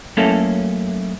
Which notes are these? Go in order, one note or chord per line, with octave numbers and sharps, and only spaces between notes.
F#2 A3 A#3 C#4 E4 A4